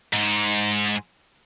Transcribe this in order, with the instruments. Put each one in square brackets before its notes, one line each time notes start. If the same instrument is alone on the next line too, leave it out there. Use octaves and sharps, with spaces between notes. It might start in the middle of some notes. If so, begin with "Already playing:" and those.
[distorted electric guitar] G#2